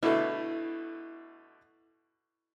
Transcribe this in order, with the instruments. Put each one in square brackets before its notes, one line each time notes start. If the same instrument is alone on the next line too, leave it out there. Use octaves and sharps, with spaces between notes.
[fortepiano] B2 D3 A3 [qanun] E4